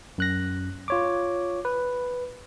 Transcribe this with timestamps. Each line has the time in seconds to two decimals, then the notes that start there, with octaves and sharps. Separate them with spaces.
0.18 F#2 F#6 A#6
0.88 F4 C#5 D6
1.65 B4